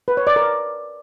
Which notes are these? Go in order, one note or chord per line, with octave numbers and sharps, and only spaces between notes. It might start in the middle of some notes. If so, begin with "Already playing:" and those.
B4
C#5
D5
A#4